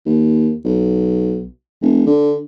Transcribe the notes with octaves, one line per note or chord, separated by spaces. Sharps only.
D#2
B1
F1
D3